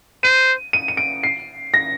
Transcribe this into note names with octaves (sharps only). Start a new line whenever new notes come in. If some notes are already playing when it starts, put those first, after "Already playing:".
C5 D#7
D#7
D#7
D7
C7
A#6